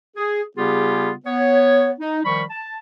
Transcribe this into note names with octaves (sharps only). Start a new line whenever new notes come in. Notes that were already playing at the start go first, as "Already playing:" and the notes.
G#4
C#3 G3 B3 F4 G4 G#4
B3 C#5
D#4
D#3 F3 G3 B5 C#6
A5